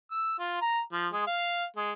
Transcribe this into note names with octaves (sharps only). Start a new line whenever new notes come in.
E6
F4
A#5
F3
G#3
F5
G#3